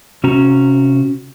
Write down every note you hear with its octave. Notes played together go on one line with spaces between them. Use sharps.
C3 C#4 F#4 A#5